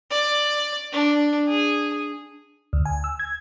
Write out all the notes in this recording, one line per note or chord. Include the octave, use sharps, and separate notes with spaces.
D5
D4
G#4
D2
G#5
E6
G#6